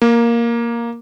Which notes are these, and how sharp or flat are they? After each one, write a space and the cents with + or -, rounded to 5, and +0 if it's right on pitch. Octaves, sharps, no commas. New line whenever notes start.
A#3 +5